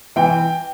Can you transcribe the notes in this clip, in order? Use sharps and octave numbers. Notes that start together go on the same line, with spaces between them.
E3 G5